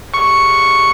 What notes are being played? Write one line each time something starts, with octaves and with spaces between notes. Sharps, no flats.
C#6